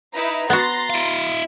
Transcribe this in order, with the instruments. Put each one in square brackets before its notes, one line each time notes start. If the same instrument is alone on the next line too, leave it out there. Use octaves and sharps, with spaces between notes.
[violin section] D#4 E4 B4 [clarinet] A#5
[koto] B3 F#4 [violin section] C6 A6 A#6
[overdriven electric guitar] E4 F5